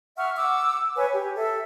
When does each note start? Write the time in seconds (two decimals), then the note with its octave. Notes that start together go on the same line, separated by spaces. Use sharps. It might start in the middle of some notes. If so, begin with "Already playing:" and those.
0.17 E5 F#5 C#6 F6
0.36 F#5 D6 E6
0.96 B4 C#5 G#5
1.14 G4
1.36 A4 E5